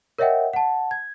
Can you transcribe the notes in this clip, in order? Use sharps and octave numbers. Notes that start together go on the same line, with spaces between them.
A#4 C#5 D#5 E5 F#5 G5
F#5 A5
G#6